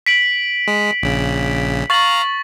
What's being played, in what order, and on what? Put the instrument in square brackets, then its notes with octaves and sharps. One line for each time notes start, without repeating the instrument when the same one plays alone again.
[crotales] B6 D7 F#7
[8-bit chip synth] G#3
A#1 C#3
[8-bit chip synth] F5 A#5 [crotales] C#6 A6 F#7